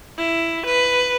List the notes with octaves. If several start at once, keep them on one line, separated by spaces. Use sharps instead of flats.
E4
B4